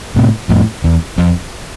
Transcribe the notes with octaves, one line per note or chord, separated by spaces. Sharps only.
A2 C3
F2 A2
E2
F2